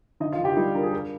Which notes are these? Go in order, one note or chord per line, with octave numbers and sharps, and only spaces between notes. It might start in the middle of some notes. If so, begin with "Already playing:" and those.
D3 D#4 D#5
F4 F5
D3
G4 G5
G3 D#4 D#5
D4 A#4
G#4
A#4